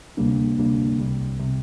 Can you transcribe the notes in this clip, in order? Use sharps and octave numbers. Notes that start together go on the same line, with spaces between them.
D2 C3 G3 A#3 D4
D2 C3 G3 A#3 D4
C2 C3 G3
C3 G3